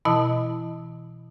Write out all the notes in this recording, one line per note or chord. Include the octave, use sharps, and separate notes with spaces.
B2 E3 E4 D#5 A5